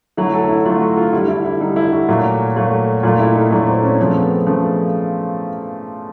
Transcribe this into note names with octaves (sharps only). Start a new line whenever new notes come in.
D3 F#3 A3 E4
A4
E4
D3 F#3 A3 F4
F#4
F4
D3 G3 E4
E4
E4
D3 G3 D#4
E4
F#4
A#2 F#3 A3
A#2 F#3 A3
A#2 F#3 A3 F4
E4
D#4
A#2 F#3 A3 D4
C4
C#4
C#3 F3 A3 C4
B3
C4
C#3 F3 A3